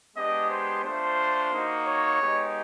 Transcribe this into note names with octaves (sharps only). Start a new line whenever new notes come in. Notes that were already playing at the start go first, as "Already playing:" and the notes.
G#3 B3 D4 G4 D#5
C5
A3 D4 F4 C5
A#3 D#4 F#4
C#5
G#3 B3 D#4 G4